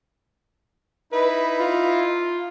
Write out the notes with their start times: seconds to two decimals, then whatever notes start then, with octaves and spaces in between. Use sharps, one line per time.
1.12 D#4 E4 B4
1.60 F4